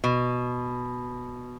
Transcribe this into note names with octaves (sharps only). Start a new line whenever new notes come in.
B2